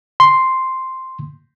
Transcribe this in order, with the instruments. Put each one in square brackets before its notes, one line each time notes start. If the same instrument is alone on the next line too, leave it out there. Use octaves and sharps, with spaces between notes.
[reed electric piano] C6